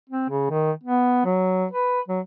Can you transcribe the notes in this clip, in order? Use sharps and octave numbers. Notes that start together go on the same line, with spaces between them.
C4
C#3
D#3
B3
F#3
B4
F#3